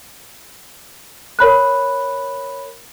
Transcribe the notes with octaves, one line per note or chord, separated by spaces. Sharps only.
A#4 C#5 B5 F#6